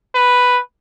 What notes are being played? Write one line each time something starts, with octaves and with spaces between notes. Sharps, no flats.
B4